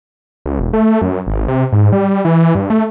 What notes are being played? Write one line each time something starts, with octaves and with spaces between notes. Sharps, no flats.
C#2
E1
A3
F#2
G#1
C3
G#2
G3
E3
G2
A3